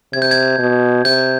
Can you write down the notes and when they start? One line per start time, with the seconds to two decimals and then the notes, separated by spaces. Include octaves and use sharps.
0.13 C3 G#6
0.22 G6
0.31 G#6
0.58 B2
1.05 C3 G6